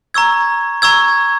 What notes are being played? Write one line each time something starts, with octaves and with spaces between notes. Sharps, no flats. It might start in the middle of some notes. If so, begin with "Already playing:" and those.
A#5 C#6 E6 G#6
A#5 C#6 E6 G#6